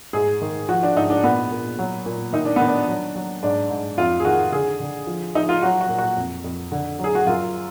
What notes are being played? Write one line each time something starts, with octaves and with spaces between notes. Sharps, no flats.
G#2 G#4
D#3
F3 F#4
D4
G#2 D#4
D4
A#2 B3
A#2
F#3
A#2
D#3 D#4
D4
D#3 B3
D4
F#3
F#3
G#2 D4
G#2
F2 F4
G#4
D#3 F#4
D3 G#4
D3
F3
F3 D#4
F4
F#3 F#4
F#4
A#2
F#4
F2
F2
D3
F#3 G#4
F#4
F#2 F4